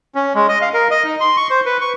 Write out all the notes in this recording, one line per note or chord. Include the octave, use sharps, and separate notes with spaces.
C#4
G#3
D#5
F5
A#4
D#5
D#4
C6
C#6
C5
B4
C#6